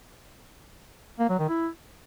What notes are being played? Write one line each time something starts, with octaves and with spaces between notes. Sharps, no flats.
A#3
F#3
D#3
E4